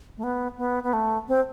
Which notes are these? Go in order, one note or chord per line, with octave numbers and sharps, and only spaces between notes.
A3
B3
B3
B3
A3
C4